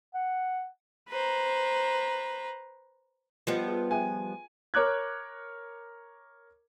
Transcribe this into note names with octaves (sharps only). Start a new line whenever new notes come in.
F#5
B4 C5 A#5
F3 G3 B3 F4 D#5
F4 G#4
G#4 E5 G5 G#5
A#4 C#5 D6 F#6 G#6